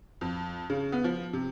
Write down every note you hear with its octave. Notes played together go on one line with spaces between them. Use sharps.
F2
C#3
B3
F3
C3